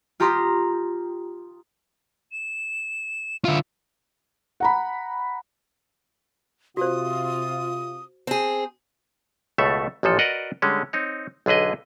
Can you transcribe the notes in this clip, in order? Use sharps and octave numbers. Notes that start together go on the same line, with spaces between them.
F4 G4 A#5 C6 D#6
E7
D3 F4 E5
F#5 A#5 B5
C3 F4 F#4 C5 D#6
C4 G#4
C#2 B2 A3 A4 E5
A1 A#2 F3 A4
F#4 A#4 B4 D5 D#5 F#5
D3 G3 G#3 C#4
C4 D#4 C#5
B1 D3 G#4 B4 D#5